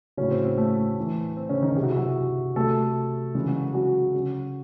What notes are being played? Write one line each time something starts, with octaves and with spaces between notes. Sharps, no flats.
A2 C#3 F#3 C#4
C4
C4
A3
A2 E3
C4
C#3 C#4
D#3 D#4
C3 F#3 F#4 G#4
E4
F#3 F#4
C3 F#3 A3 A4
C#3 E3 G#3 G#4
F#3 F#4
F#3 F#4
C#3 F#3